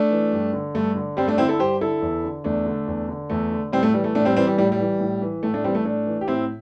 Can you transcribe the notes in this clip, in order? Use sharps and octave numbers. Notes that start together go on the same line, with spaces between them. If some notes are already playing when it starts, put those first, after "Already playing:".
Already playing: A3 D4
E3
G2
D3
G2 A3
D3
G2 G3 C4
A3 D4
D3 C4 E4
E4 A4
G2 G4 C5
D3 E4 A4
E2
D3
E2 A3 D4
D3
E2
D3
E2 A3
D3
A2 G3 C4
A3
E3 G3
A3
A2 A3 D4
G3 C4
E3 G3 C4
G3
A2 G3
G3
E3
A2
E3
A2 A3
A3 D4
E3 G3 C4
A3
A2 A3 D4
E3
G4
A2 C4 E4